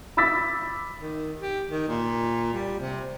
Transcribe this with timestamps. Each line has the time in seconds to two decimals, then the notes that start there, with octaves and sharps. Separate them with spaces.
0.17 B5 D6 E6 A6 B6
1.00 D#3
1.37 G4
1.69 D#3
1.89 A#2
2.53 G3
2.80 C3